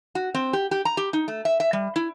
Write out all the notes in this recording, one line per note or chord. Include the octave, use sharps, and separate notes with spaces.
F#4
C4
G4
G4
A#5
G4
D#4
A3
E5
E5
G3
E4